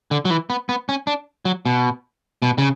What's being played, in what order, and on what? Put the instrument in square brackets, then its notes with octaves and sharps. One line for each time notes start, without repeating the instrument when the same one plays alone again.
[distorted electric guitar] D3
F#3
E3
B3
B3
C#4
D4
F#3
B2
B2
C#3